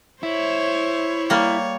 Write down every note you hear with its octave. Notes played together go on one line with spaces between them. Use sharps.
E4 C5 C#5
G3 A#3 C#5